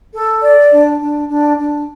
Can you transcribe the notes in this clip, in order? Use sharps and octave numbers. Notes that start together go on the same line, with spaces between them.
A4
D5
D4
D4
D4
D4